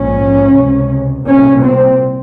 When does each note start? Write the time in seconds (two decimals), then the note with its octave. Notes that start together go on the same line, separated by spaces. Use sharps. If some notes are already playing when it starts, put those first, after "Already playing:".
Already playing: A#1 G#2 C#4
0.55 C#2 C3
1.27 C2 A#2 C#4
1.64 C4